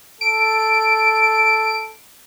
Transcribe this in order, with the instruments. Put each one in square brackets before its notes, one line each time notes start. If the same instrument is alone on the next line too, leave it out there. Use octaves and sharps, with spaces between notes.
[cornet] A4 [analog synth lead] D7